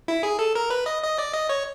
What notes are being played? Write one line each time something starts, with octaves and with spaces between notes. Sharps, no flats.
E4
G#4
A4
A#4
B4
D#5
D#5
D5
D#5
C#5